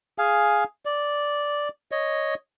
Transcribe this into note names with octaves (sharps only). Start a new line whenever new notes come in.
G#4 F5 G#5
D5
C#5 D#5